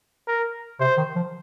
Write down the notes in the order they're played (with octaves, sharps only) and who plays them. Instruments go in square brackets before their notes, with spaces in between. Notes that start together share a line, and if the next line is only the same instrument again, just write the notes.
[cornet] A#4
[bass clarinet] C3 [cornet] C5
[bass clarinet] D#3
F3